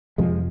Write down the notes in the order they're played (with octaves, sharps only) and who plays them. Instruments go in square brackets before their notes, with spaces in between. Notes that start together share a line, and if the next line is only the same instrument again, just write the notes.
[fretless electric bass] F2 C3 F3 G#3